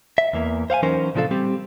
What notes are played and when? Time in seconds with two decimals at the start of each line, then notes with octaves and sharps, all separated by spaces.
0.18 E5
0.33 E2 E3 A#3
0.70 C5 F5 F#5 G#5
0.83 E3 F#3 C#4 D#4 A#4 C5
1.15 A#2 C#3 F3 D4 A4 F5
1.31 G3 C4 G4